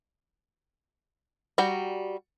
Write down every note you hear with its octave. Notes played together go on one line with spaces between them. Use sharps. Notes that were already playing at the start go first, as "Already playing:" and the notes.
G3 F#4 G5 A#5